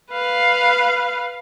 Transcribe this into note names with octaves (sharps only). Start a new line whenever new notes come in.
B4 F5